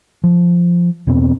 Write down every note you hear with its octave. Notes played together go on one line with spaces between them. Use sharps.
F3
E2 B2 B3 C4